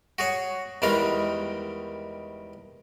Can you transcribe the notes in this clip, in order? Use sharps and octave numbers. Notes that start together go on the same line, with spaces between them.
F#4 G#4 C#5
E2 D#3 G3 G#3 F5